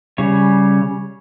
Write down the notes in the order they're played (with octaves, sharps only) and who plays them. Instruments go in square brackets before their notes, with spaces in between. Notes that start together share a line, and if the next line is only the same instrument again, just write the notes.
[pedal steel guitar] C#3 G3 C#5